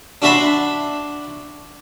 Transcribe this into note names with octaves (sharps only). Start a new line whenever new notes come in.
D4 F#4 E5 A5 B5 C6